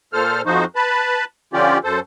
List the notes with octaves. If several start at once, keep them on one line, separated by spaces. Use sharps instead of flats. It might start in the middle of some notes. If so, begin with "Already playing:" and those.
A#2 A4 C5 F6
F2 F3 D#4 F#4 C5
B4 A5 B5
D3 F3 C#4 F4 G4 D5
F#2 A4 C5